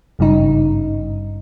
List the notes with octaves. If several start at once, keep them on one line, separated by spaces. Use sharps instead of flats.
G#1 G2 C#3 D#4